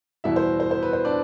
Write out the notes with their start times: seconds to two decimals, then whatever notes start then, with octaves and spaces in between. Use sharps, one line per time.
0.24 E2 B2 G3 E4 E5
0.36 C5
0.60 C5
0.71 C5
0.83 B4
0.93 C5
1.05 D4 D5